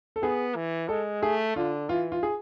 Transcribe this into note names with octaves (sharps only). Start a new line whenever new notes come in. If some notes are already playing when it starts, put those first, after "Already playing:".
A4
B3 G#4
E3
G#3 A4
A3 G#4
D3 F4
E3 F4
F4
G#4